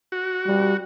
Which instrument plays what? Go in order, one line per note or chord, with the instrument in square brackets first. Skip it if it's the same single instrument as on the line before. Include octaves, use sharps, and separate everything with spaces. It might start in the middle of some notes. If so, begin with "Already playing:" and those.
[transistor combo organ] F#4
[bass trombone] G3